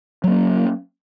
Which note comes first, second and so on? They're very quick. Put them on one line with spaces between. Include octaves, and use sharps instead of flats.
F#3 A#3 C#4